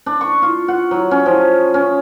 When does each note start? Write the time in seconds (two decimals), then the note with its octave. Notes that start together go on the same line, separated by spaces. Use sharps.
0.06 D4
0.21 C#6
0.42 F4
0.68 F#5
0.91 F#3
1.11 C#4
1.26 F3
1.74 C#4